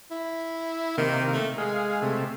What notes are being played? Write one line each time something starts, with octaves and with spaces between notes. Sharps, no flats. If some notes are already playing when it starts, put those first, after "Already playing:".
E4
C3 D#3 A#3
A3
G#3 G#4 F5
C3 A3